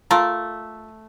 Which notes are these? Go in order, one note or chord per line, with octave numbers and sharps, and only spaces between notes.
A3 F4 A#4 A5